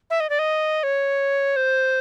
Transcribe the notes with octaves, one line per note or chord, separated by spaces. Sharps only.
E5
D#5
D5
D#5
C#5
C5